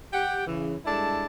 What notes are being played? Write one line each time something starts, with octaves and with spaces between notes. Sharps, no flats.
G4 F#5 G5
C#3 E3
G3 G#3 D4 E4 A4 A5